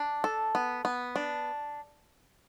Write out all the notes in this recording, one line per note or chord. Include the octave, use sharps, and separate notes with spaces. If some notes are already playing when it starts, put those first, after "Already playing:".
Already playing: D4
A4
B3
B3
D4